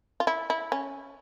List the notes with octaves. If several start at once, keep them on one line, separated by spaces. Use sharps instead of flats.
F4
E4
E4
C#4